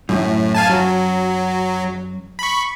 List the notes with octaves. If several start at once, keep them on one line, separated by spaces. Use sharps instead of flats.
F#2 A2
F5 G#5 A5
F#3
B5 C#6